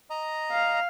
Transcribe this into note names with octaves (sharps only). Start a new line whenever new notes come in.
D#5 A#5
F5